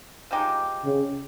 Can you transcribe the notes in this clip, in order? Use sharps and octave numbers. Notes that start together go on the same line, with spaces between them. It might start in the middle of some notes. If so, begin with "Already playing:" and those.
F3 G#3 D#4 G4
C#3